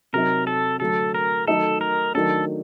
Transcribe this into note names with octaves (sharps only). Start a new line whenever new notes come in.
C3 F#3 C4 D#4 A#4
A4
D3 F#3 A3 A4
A#4
D#3 F#3 A3 D#4 A4
A#4
D#3 F#3 A3 D4 A4